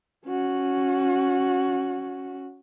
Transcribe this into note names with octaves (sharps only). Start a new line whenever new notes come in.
C#4 F#4